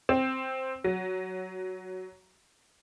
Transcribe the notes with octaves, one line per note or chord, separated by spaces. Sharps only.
C4
F#3